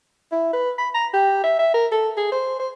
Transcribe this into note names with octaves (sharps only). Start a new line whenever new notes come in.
E4
B4
B5
A#5
G4
E5
E5
A#4
A4
G#4
C5
C5